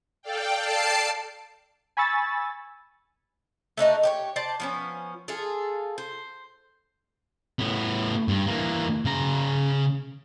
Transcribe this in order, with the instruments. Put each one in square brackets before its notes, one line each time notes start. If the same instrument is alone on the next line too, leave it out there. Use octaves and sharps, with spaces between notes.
[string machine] A4 D5 F5 [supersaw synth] G5
[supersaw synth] A5 C7 D7
[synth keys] G#5 B5 C#6 E6 A6
[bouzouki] A3 D4 D#4 F#4
G4 C5 C#5
C5 D5 A5
F3 B3 C#4
F4 G#4 A4
C5
[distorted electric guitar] A2 B3
G2
E3 A#3
C#3 A#5